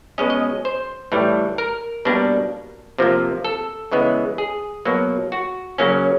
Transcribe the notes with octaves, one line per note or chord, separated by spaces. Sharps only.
B2 G#3 C#4 D#5
D#5
C5
A2 E3 G3
A#4
B2 G3 A#3 D4
C3 F3 A#3
A4
C#3 E3 G#3 B3
G#4
B2 F#3 A#3
F#4
C#3 F#3 A#3 C#4